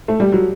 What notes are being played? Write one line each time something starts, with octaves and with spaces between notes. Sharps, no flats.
A3
G3
F#3